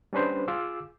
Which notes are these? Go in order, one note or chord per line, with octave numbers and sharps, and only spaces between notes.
G3 C#4 D4 B4 C5
F4 G#4 D6 E6